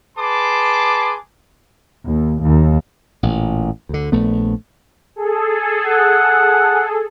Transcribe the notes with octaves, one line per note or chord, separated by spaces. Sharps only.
G#4 B4 A5 C6 D6
D#2
D#2
A1 A#2
D2 D3
A#1 A3 B3
G#4 A4
F#5